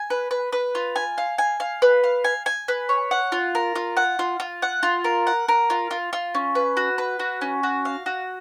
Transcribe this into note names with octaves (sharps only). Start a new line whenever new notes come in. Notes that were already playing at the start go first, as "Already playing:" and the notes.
Already playing: G#5
B4
B4
B4
F4
G#5
F5
G#5
F5
B4
F5
G#5
G#5
B4
C#5
F#5
F4
A#4
F4
F#5
F4
F4
F#5
F4
A#4
F#5
A#4
F4
F4
F4
C#4
B4
F#4
B4
F#4
C#4
F#4
F5
F#4